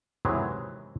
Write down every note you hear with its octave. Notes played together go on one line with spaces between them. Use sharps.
C3 D#3 E3 F#3 G#3